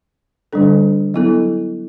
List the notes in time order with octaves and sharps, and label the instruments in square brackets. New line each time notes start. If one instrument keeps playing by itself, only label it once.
[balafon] D3 G3 D4 A4
F#3 B3 E4 A4